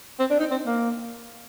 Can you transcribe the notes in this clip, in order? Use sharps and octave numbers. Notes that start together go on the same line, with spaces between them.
C4
D4
D#4
C4
A#3